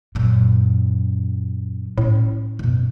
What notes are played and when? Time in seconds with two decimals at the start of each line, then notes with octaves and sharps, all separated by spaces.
0.15 F#2 A#2
1.98 A2 C#4
2.59 F#2 B2